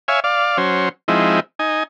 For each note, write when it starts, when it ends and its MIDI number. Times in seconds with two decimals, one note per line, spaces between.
0.08 0.20 73
0.08 0.20 76
0.08 0.20 77
0.08 0.20 80
0.24 0.57 74
0.24 0.57 77
0.58 0.89 54
0.58 0.89 61
0.58 0.89 72
1.08 1.40 53
1.08 1.40 56
1.08 1.40 60
1.08 1.40 63
1.08 1.40 64
1.59 1.83 63
1.59 1.83 80